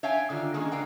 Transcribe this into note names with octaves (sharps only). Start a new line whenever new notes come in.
C#5 E5 F5 G5 G#5
D3 D#3 F4 G4
D#3 G#3 A#3 C#4
D3 A#4 F5 G5